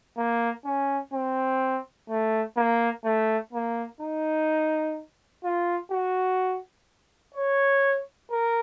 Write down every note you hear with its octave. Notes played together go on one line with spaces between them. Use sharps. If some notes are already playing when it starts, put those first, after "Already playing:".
A#3
C#4
C4
A3
A#3
A3
A#3
D#4
F4
F#4
C#5
A#4